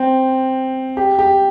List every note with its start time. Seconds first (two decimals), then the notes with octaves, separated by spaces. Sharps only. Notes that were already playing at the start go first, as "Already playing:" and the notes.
Already playing: C4
0.97 G4
1.19 G4